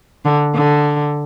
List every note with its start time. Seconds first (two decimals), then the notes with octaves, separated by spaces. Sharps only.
0.25 D3
0.55 D3